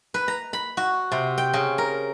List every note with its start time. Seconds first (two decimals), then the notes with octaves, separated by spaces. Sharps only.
0.14 B4
0.28 A#5
0.53 B5
0.77 F#4
1.12 C3
1.38 G5
1.53 C#3
1.78 A#4